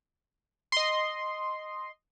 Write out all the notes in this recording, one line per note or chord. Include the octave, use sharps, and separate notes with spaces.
D#5 C6